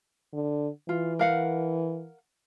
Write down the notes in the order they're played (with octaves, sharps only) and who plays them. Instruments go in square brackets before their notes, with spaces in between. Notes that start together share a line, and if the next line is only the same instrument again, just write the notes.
[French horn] D3
[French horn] E3 [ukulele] F4
[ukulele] A#4 F5 F#5